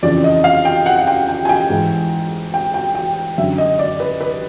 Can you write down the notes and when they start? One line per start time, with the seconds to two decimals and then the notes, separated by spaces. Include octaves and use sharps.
0.03 F2 C#3 E3 D5
0.24 D#5
0.44 F5
0.65 G5
0.86 F#5
0.99 F#5
1.07 G5
1.28 G5
1.45 G#5
1.49 G5
1.70 G#2 E3
2.54 G5
2.74 G5
2.95 G5
3.37 F#2 D3 E5
3.58 D#5
3.79 D5
4.00 B4
4.21 B4